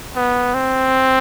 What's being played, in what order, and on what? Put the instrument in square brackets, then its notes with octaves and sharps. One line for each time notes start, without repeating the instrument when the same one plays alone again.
[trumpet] B3
C4